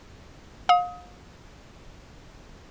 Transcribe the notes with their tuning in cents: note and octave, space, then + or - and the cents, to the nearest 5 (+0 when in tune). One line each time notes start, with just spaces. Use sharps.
F5 +35 D#6 +30